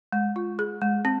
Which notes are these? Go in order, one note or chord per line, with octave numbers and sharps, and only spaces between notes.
G#3
F4
G#4
G#3
C4